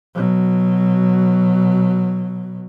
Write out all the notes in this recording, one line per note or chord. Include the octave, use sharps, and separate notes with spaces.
B2 F#3